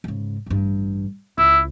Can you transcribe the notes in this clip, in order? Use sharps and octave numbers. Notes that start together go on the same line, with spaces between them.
G#2 C#3
A1 G2
C#2 E4